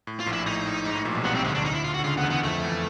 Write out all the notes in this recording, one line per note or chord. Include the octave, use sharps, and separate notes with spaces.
A2
F4
A#1 A#2
E4
A2 D#4
A2
G#2
A2
A#1 A#2
B1 B2
C2 C3 B3
C4
D2 D3 G#3
D4
D#4
E4
F4
F#4
D3
C#2 C#3 F4
B3
E2 E3
B3
F2 F3 A3
E2 E3